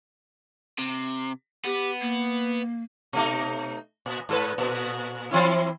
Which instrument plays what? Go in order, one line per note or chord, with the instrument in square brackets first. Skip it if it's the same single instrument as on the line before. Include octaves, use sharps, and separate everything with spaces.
[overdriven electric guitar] C3
[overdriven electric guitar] B3 [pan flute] G4
[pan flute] A#3
[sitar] B2 A3 D#4
A#2
G#2 A4 B4
A#2
E3 C4 E4